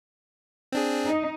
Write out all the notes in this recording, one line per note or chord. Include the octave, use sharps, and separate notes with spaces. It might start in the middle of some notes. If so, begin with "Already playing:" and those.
C4 D4 G#4
D#4 D#5